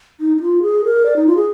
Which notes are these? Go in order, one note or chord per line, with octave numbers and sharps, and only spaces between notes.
D#4
D#4
F4
G#4
A#4
D5
D#4
F4
G#4